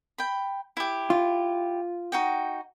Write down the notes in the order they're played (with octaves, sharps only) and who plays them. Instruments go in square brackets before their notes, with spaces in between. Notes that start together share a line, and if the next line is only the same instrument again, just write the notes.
[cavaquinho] G5 B5
E4 G4
[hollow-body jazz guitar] F4
[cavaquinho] D#4 F#4 G5